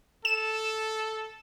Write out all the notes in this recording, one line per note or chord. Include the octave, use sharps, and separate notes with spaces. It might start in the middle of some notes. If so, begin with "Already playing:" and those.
A4 E7